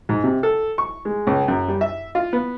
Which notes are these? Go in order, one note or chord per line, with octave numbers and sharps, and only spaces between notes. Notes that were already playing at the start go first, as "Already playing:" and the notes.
G#2
C3
A4
C#6
G#3
C#2
F#2
G3
E5
F4
B3